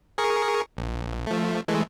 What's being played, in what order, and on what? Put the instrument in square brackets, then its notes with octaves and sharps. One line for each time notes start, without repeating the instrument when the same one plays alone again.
[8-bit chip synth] G#4 A#4 C#6
A#1
F3 A3
E3 G#3 A3